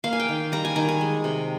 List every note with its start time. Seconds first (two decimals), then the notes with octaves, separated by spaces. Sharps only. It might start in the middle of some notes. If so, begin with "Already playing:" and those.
0.04 A#3 F5
0.13 G#5
0.20 G5
0.29 D#3
0.52 G3 A#5
0.65 G#5
0.76 D#3 A#5
0.89 G#5
1.01 G#3
1.24 C3